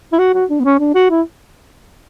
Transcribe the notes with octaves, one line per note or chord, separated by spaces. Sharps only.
E4
F#4
F#4
D4
B3
C#4
D4
F#4
E4